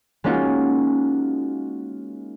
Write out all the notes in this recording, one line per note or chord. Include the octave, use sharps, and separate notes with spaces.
G#3 A#3 C#4 D#4 F4 F#4